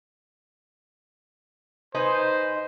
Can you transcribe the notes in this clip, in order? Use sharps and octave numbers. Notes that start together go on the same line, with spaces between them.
D#4 B4 C5 G#5